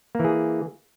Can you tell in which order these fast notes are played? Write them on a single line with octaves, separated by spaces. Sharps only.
A#3 E3 G#4